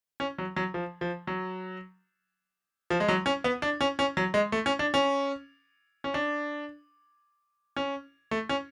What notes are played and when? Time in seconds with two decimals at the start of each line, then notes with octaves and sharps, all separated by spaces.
0.20 C#4
0.38 F#3
0.56 F#3
0.74 F3
1.01 F3
1.27 F#3
2.90 F3
3.00 G#3
3.08 F#3
3.26 C#4
3.44 B3
3.62 D4
3.81 C#4
3.99 C#4
4.17 F#3
4.34 G#3
4.52 A3
4.66 C#4
4.79 D4
4.94 C#4
6.04 C#4
6.14 D4
7.77 C#4
8.31 A3
8.49 C#4